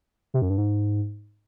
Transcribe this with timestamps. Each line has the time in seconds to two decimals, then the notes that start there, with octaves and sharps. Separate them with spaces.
0.34 C3
0.42 F#2
0.50 G2
0.58 G#2